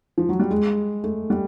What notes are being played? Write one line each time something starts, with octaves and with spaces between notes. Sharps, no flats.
F3
F#3
G3
G#3
A3
G3